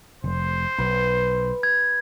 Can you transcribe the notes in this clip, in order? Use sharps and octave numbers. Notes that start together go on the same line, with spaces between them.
F1 C5
B1 B4
G#6